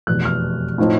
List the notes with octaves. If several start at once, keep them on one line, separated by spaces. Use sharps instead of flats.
F1 E2 B2 F#6
F6
A2 F3 A3 C4 D#4